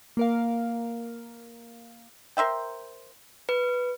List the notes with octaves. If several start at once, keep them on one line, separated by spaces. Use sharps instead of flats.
A#3 A#4 F5
A#4 C5 E5 G5
B4